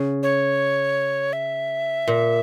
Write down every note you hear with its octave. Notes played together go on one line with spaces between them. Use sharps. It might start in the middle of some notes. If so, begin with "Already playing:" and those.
Already playing: C#3
C#5
E5
A#2